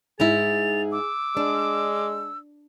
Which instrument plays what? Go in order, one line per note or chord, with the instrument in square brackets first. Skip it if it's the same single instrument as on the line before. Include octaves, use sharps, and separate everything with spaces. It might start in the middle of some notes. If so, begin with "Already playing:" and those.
[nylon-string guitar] G#2 D#4 E4 [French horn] G#4 [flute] A6 [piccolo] F7
[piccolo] D6 [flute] E6
[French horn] G#3 [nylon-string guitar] D4